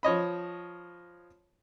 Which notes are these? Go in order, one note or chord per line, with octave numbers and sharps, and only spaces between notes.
F3 C#5 D#5 B5